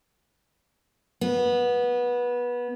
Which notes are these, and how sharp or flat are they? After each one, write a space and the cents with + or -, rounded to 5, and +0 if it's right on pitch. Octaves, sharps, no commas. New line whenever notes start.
B3 -20